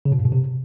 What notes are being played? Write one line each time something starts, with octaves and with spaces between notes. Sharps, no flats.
C#3
B2
G2
B2
C3